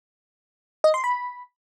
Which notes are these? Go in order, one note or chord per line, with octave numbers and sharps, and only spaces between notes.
D#5
C6
B5